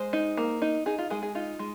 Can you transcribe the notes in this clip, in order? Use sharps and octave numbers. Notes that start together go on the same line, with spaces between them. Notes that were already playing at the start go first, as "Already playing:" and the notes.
Already playing: G#3 C5
D#4
A#3
D#4
D#4 G#4
F4
G#3 G#4
G#4
D#4 F4
G#3